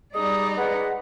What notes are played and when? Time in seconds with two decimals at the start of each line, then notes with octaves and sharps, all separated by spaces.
0.14 G3 G#3 D#4 D5 D#6
0.57 G#3 B4 F#5